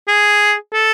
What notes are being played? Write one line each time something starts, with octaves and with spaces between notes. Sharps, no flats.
G#4
A4